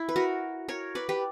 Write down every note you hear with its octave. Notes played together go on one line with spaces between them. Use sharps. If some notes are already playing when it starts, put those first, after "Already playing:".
Already playing: E4
B4
F#4 A#4
A#4 C#5
B4 D5
G4 B4